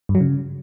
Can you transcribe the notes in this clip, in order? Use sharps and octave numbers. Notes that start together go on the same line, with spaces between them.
G2
F#3
C#3